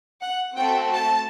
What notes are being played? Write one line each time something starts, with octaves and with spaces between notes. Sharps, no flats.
F#5
A3 C4 F#4 A4 G5
A5